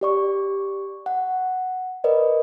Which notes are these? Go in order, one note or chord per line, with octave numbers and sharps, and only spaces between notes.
G4 D5 C#6
F#5
A#4 B4 D5 D#5